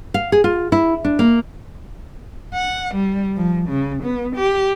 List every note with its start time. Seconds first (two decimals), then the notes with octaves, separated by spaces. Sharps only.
0.14 F5
0.32 G#4
0.44 F4
0.72 E4
1.05 D4
1.19 A#3
2.54 F#5
2.95 G3
3.36 F3
3.69 C#3
4.04 B3
4.36 G4